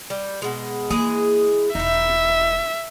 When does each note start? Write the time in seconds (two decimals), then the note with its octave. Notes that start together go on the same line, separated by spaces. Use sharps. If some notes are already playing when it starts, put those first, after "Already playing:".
0.10 G3
0.42 B2 G#3
0.90 E3 G#3 A#3 G#4
1.75 E1 D#4 E4 E5